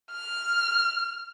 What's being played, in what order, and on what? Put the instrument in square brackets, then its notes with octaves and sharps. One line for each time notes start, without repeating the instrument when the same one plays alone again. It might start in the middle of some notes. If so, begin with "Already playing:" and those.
[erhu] F6